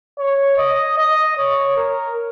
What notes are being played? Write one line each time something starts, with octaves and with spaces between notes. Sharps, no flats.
C#5
D#5
D#5
C#5
A#4